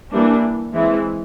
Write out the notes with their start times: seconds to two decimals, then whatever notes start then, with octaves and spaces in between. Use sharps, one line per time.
0.12 E3 G3 A#3 D4
0.73 E3 G#3 C4 E4